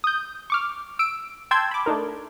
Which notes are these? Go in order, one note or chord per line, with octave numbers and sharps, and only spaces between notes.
D#6 G6
C#6 D6 F6
E6 D7
G5 A5 C6 E6 G6 G#6
B5 D6
A3 D4 D#4 A#4